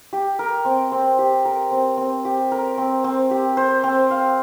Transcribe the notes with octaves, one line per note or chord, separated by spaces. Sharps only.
G4
A#4
C4
C4
G4
A#4
C4
C4
G4
A#4
C4
C4
G4
C5
C4
F5